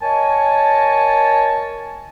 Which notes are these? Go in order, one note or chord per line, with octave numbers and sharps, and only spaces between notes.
A#4 C#5 D#5 G#5 A5